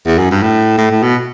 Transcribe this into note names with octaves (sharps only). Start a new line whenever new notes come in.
E2
F#2
G2
A2
A2
A2
B2